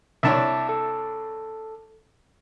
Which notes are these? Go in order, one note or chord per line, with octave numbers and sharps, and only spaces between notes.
C2 D4 C#5 E5 A5 D6
A4